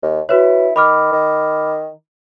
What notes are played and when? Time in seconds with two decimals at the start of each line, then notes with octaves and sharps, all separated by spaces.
0.03 D#2
0.29 E4 F#4 B4 C#5
0.76 D#3 B5 D6 F6
1.12 D#3